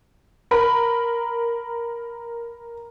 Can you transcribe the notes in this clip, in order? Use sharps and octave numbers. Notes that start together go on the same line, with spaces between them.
A#4 B5